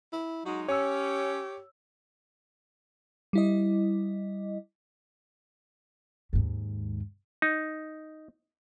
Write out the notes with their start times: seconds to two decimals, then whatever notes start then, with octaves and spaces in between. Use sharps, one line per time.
0.13 E4
0.46 F#3 G#3 D#4 F#4
0.68 C#4 G4 C#5 E6
3.33 G3 E4 D#5
6.33 D#2 G#2
7.42 D#4